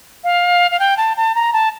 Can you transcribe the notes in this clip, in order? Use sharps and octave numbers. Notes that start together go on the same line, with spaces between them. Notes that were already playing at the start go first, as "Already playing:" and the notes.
F5
F5
G5
A5
A5
A#5
A5